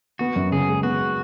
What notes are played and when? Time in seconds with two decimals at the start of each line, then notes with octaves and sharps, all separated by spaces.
0.19 B3 F#4
0.36 F#2
0.52 C#3 G#4
0.68 G#3
0.83 B3 F#4